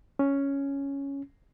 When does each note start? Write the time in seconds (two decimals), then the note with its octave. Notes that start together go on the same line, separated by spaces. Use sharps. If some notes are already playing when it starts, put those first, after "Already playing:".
0.19 C#4